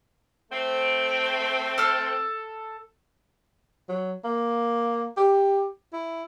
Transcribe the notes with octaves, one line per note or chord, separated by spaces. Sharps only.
A3 C4
A4 F6
F#3
A#3
G4
E4